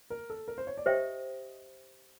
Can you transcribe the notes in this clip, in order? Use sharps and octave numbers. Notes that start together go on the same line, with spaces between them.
A#4
A4
A#4
C5
C#5
D5
G4 C5 D#5 E5 G5